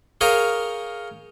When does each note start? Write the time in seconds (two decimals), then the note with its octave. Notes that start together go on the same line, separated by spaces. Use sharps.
0.21 G#4 A#4 C#5 F5 G5 G#5